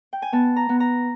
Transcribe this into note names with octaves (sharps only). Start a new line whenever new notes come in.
G5
G#5
B3 A5
A#5
B3
A#5